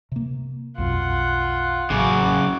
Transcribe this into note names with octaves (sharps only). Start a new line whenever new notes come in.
C3 A#3
B1 F2 B2 F4 F#5
A1 F#2 C#3 F#4 D6